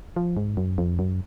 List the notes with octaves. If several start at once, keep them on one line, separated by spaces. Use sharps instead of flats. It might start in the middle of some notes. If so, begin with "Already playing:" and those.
F3
G#2
F#2
F2
F#2